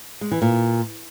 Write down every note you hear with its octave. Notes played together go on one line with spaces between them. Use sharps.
G#3
E3
A#2